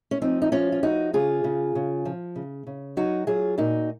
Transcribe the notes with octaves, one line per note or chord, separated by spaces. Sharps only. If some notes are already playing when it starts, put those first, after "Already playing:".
C#4
F3 C4 D#4
D#4
F3 C#4 F4
F4
F3 D#4 F#4
C#3 F4 G#4
C#3
C#3
F3
C#3
C#3
F#3 D#4 F#4
F#3 F4 G#4
A#2 D#4 F#4